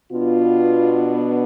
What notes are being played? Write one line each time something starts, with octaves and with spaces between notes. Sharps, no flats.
B2 B3 D4 F4